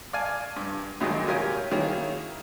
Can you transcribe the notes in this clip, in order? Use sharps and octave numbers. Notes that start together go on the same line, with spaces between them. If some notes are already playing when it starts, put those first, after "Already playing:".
D5 F5 G#5 A5
G2 D6
F#2 A#2 D#3 G#3 A3
F4 G4 A#4 C#5 G#5
D#3 A#3 C#4 E4 G#4 C#5